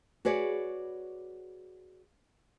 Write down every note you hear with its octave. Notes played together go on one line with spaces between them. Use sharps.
F#4 G#4 B4 C#5 D5